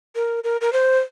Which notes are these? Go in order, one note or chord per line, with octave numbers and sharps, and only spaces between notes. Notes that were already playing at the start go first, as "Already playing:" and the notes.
A#4
A#4
A#4
C5